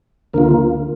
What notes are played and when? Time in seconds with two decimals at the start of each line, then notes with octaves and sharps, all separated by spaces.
0.33 D2 D3 A#3 F4 A#4